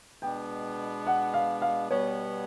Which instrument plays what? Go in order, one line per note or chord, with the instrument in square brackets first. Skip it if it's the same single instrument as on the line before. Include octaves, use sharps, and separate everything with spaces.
[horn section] B2 G#3 B3 D4 [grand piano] G5
[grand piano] F#5
F5
F5
[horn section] B2 G3 B3 [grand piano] C#5